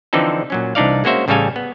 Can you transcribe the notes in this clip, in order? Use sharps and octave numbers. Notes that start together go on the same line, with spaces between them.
D3 E3 F3 C4 D#4 A4
A#2 F#3 C#4
C2 E3 D4 D#4 D5 F5
G#3 A#3 C#4 F#4 C5 E5
A1 C#3 G3 A4 F5 G#5
B3